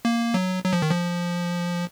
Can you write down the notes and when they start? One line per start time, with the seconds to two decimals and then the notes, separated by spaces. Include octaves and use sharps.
0.05 A#3
0.34 F#3
0.64 F#3
0.73 F3
0.82 D#3
0.91 F3